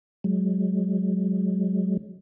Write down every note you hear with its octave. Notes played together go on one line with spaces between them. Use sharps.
F#3 G#3